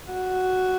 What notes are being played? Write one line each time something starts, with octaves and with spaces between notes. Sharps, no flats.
F#4